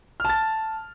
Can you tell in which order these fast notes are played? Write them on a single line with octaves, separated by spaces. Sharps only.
F6 A5 A6